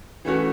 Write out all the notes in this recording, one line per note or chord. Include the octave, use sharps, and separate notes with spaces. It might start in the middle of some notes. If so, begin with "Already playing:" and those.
E3 A3 C#4 F#4